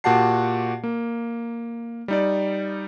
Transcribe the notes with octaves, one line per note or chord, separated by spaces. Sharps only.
A#2 F#4 G4 F#5 A5 C7
A#3
G3 D#4 D5